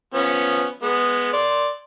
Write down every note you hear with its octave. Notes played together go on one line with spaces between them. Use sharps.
F3 B3 C#4
G#3 B3
D5 C6